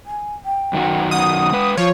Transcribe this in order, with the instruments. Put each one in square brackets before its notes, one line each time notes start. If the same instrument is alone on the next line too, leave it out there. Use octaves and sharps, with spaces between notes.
[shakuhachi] G#5
G5
[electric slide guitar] F#2 D#3 F#4
[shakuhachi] F#5 [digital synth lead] D#6
[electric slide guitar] G#3 B4
[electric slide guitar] F3 [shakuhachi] F4 [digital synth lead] C#5